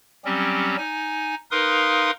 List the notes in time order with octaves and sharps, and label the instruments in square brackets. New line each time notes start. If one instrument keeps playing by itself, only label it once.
[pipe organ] F#3 G3 C4 C#4 G4
D#4 G#5
D#4 A#4 B4 F5 C6 D#6